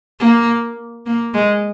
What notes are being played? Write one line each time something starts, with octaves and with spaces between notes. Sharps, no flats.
A#3
A#3
G#3